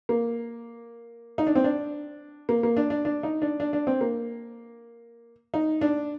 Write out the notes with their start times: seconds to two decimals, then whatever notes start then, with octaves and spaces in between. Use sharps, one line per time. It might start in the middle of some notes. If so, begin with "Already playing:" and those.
0.09 A#3
1.38 D#4
1.47 D4
1.55 C4
1.64 D4
2.49 A#3
2.63 A#3
2.77 D4
2.90 D4
3.05 D4
3.23 D#4
3.42 D4
3.60 D4
3.73 D4
3.87 C4
4.01 A#3
5.54 D#4
5.81 D4